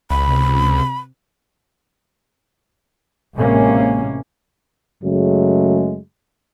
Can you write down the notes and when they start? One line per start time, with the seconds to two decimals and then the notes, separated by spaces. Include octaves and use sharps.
0.10 C#2 B5
0.26 C3
3.35 A1 A2 C3 G#3 A#3 C#4
5.03 F#2 C#3 F#3 G#3 A3